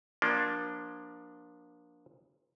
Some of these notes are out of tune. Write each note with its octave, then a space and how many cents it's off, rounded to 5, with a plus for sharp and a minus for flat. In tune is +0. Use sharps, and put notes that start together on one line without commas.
F3 +20 A#3 +30 D4 +0